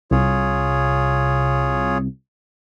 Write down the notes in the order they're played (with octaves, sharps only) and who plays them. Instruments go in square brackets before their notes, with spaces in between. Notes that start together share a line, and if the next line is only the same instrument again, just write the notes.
[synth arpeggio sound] C2 [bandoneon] F4 G#4 C#5